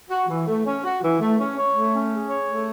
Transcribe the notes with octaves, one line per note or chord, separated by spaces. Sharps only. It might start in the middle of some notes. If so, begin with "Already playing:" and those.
F#4
E3
A3
C#4
F#4
E3
A3
C#4
C#5
A3
C#4
G#4
C#5
A3